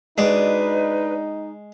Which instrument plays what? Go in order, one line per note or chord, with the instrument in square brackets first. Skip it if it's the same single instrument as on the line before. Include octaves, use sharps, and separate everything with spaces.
[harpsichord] G#3 [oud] D4 F#4 D5 [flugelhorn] D#4 [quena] B4